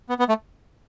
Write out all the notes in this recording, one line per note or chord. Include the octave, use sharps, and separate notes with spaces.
B3
B3
A3